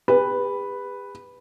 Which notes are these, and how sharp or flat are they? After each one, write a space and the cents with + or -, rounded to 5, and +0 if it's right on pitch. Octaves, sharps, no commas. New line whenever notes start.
G4 +45 B4 +0